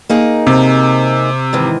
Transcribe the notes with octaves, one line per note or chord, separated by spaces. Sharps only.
A#3 D#4 G#4
C3
G#2 D#3 E3